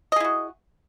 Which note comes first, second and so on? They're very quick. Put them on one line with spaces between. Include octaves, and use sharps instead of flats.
D#5 G#4 E4 F#4